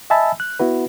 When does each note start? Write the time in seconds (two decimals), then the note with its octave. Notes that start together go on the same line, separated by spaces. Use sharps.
0.10 D#5 E5 G#5 A5 B5 E6
0.40 F#6
0.60 B3 E4 F#4 B4